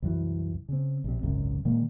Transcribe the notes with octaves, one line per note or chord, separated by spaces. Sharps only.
C2 F#2 E3
C#3 C4
A#1 C3
G#1 C#2 F#2 C3
A#2 D#3 G#3 A#3